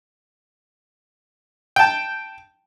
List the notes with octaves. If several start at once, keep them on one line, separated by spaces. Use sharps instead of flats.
G5 A5